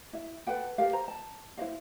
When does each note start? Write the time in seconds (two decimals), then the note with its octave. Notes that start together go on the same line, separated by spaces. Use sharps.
0.13 E4 E5
0.47 A4 B4 F#5 G5
0.78 G4 A4 A#4 F5
0.93 C5 A#5
1.08 A5
1.57 E4 C5 D#5 F5